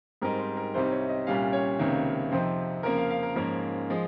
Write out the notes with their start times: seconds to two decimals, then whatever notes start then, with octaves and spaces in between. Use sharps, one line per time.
0.22 G#2 G3 C4 D#4 A#4
0.39 C5
0.57 A#4
0.74 C2 C3 G3 C4 D#4 C5
0.91 C#5
1.09 D#5
1.27 C2 A#2 G3 C#4 F5
1.53 C#5
1.79 C#2 C3 D#3 A#3
2.31 F2 C3 F3 C4 D#4 C5
2.83 F2 C#3 F3 A#3 A#4
2.97 F5
3.11 F5
3.23 A#4
3.36 G#2 F3 A#3 C#4 A#4
3.90 F3 G#3